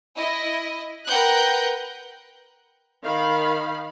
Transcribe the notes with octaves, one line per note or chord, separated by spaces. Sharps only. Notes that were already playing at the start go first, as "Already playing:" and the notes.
E4 D#5
A#4 B4 F#5 G5 F#6 G6
D#3 F5 B5